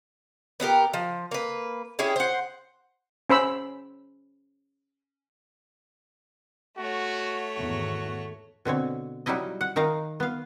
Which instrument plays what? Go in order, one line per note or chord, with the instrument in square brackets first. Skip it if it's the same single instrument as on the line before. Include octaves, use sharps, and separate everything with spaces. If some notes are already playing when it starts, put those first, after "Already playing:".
[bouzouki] B3 D4 G4 A#4
F3
A#3 B4
C#4 E4 G4 G#4
C5 F#5
[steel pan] C#4 C5 B5 E6
[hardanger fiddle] A3 C#5 [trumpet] F#4
[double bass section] E2 G#2 D#3 [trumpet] F#4
[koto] B2 D3 C4 C#5
F#3 G3 D#4 E4 D#5
F#5
D#3 D#4 A#4 F5 A#5
B3 F5